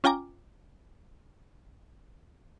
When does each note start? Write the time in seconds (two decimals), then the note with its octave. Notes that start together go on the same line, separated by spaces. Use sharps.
0.04 C#4 F4 G5 G#5 A#5 D6